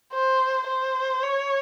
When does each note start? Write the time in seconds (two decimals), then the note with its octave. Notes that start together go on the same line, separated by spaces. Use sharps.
0.13 C5
0.68 C5
1.23 C#5